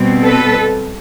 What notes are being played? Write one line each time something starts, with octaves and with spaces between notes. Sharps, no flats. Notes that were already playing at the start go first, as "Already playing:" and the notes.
Already playing: B2 G3 C4
A4 B4